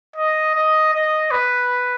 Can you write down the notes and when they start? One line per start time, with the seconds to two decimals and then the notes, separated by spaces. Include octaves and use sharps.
0.16 D#5
0.55 D#5
0.94 D#5
1.31 B4